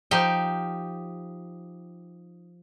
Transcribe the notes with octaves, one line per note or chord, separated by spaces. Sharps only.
F3 D#4 G4 G5